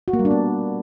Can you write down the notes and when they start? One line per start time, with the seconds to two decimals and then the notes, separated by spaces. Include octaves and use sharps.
0.08 F#4
0.13 A#3
0.19 G3
0.25 D4
0.31 B3